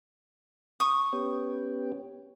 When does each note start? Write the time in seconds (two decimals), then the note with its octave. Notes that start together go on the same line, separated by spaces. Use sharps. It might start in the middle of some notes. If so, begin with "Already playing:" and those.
0.80 C#6 D#6
1.13 B3 C#4 G4